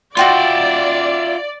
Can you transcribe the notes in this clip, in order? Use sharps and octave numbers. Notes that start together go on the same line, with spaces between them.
F4 F#4 D5 E5 G5 C6